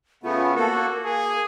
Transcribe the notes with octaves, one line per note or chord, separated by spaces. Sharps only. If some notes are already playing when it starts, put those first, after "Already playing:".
C#3 A3 B3 F4
A#3 F#4 A4 A#4
A#3 G#4